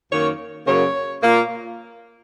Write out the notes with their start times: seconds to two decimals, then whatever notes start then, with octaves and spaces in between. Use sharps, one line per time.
0.11 F#2 D#3 A#3 C#5
0.66 F#2 C#3 F#3 A#3 C#5
1.21 A#2 A#3